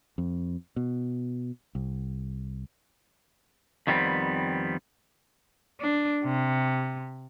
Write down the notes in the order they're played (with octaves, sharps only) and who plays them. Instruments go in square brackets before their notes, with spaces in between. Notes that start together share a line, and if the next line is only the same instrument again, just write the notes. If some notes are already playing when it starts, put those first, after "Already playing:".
[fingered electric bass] F2
B2
C2
[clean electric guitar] F2 D#3 G3 B3 C4
[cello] D4
C3